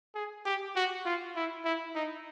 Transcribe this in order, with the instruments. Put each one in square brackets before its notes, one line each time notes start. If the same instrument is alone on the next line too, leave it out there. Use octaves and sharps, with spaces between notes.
[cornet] G#4
G4
F#4
F4
E4
E4
D#4